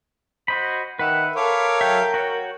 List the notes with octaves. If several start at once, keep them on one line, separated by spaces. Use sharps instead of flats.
F#4 C5 D#5 B5
D#3 B4 E5 F#5
A4 A#4 C#5 F5 D6
F#3 E5 G5
F#4 C#5 F#5